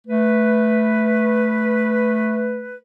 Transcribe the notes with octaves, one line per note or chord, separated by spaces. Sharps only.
A3 B4